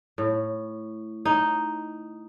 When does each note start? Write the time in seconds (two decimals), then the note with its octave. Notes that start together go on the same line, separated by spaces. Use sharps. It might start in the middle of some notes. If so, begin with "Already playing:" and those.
0.18 A2
1.25 D#4